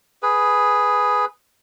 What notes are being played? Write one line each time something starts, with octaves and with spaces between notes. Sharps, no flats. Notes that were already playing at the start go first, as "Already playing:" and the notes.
G#4 B4